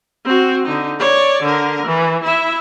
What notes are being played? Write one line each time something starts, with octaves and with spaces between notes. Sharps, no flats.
C4 F#4
D3 D#4
C#5 D5
D3 A#4
E3
E4 E5